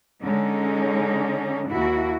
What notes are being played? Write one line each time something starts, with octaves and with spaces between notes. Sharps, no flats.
D3 G#3 C#4 D#4
D#2 E4 F#4